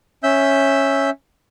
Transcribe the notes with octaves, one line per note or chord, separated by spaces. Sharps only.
C#4 E5 E6 G6